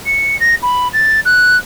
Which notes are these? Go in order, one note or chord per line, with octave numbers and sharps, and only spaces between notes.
C#7
A#6
B5
A6
F#6